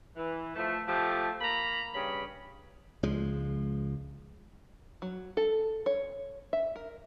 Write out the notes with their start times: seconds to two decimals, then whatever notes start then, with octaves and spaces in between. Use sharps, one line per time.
0.15 E3
0.55 F3 A3
0.88 F3 A3 G4
1.40 A#3 A#5 B5
1.93 G2 C#3 B5
3.03 C#2 F3 G#3
5.02 F#3
5.37 A4
5.86 C#5
6.53 E5
6.76 A#4